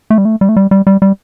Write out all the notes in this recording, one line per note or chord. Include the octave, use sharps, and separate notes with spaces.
A3
G3
A3
G3
A3
G3
G3
G3
G3